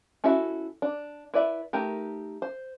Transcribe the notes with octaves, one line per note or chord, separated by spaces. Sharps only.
C#4 E4 F#4 A4 E5
D4
E4 B4 D5 E5
A3 D#4 G4 A#4
C5